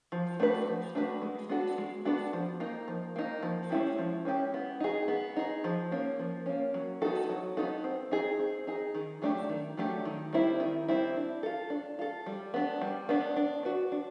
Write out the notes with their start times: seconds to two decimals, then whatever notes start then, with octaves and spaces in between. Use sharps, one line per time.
0.12 F3
0.40 A3 D4 F#4 B4
0.67 F3
0.95 A3 D4 F#4 B4
1.22 G#3
1.49 B3 D4 F#4 A4
1.78 G#3
2.05 B3 D4 F#4 A4
2.33 F3
2.60 A#3 D#4
2.88 F3
3.16 A#3 D#4
3.43 F3
3.71 G#3 C#4 E4 G4
3.98 F3
4.25 G#3 C#4 E4 G4
4.54 B3
4.80 D#4 G#4
5.08 B3
5.36 D#4 G#4
5.64 F3
5.91 A#3 C#4
6.19 F3
6.46 A#3 C#4
6.74 F#3
7.02 B3 D#4 F#4 A4
7.29 F#3
7.57 B3 D#4 F#4 A4
7.84 C4
8.12 D#4 G#4
8.39 C4
8.67 D#4 G#4
8.95 D#3
9.22 F#3 A3 D4 G4
9.49 D#3
9.77 F#3 A3 D4 G4
10.05 D#3
10.33 G3 C4 E4
10.60 D#3
10.88 G3 C4 E4
11.16 D4
11.43 F4 A4
11.70 D4
11.99 F4 A4
12.26 G3
12.54 B3 D4
12.82 G3
13.09 B3 D4
13.36 D4
13.63 F#4 B4 D5
13.92 D4